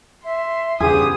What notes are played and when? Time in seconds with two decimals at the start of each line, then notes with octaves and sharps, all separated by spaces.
0.24 E5 C6
0.80 E2 G2 C#3 B3 G4 G#4 D#6